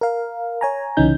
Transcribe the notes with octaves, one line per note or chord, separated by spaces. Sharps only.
A#4 F5
C#5 G#5 A#5
C2 C#3 E3 C#4 D#4 G6